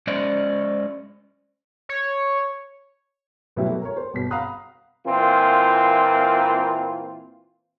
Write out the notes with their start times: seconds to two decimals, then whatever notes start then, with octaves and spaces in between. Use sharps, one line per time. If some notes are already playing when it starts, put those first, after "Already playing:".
0.07 G#3 C#4 C5 D5 D#5
1.89 C#5
3.56 A1 B2 F#3 G3 E4 E5
3.70 B3 F#4 A4
3.82 A#4 C#5
3.97 C5
4.14 G1 B2 B6
4.31 F5 F#5 A#5 B5 D#6 F#6
5.06 A#2 E3 A#3 C4 F4